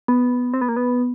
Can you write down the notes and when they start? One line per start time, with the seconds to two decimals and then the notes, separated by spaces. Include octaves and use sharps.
0.08 B3
0.54 C4
0.61 B3
0.69 A#3
0.76 B3